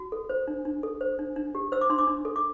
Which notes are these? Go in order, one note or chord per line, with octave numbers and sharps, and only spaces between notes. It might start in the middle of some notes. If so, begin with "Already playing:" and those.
Already playing: F#4
A4
C5
D4
D4
A4
C5
D4
D4
G4
C5 E6
D6
D4 C6
D6
D4
A4
D6